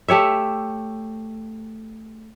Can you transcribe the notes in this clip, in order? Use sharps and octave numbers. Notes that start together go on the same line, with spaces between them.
A3 G4 C#5 E5